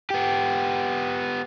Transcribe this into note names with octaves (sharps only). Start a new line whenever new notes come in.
B3 G4